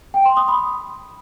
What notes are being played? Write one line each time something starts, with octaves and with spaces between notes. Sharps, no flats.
G5
C6
D#6
B5